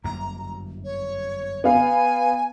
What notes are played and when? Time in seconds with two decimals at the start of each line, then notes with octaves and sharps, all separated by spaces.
0.04 G1 F#2 A#3 A#5
0.84 C#5
1.64 B3 F5 G#5